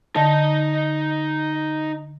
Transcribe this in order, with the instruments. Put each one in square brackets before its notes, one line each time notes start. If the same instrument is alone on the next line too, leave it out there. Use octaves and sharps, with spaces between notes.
[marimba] D3 A5 [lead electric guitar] D#4 D#5